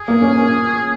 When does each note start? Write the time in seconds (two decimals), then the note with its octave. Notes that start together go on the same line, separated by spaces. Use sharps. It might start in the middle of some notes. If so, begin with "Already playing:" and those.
Already playing: G#4
0.08 A#3
0.22 C#4
0.36 C#4